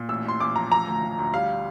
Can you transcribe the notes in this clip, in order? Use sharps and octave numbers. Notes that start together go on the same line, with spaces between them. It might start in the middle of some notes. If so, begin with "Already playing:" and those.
Already playing: A#2
A1 E6
A1 C6
A1 D6
F3 A#5
F3 A#5
D2
F3
D2
G3 F5